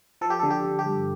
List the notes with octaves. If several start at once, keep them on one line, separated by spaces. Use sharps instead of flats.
F3 A4
G4
D3 A4
G4
D3
G4
G2